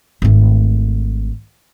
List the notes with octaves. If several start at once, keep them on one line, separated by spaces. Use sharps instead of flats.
G#1 A3